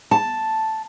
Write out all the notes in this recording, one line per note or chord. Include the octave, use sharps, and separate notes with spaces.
A5